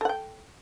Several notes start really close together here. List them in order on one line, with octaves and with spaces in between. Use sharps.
A4 F#5 G5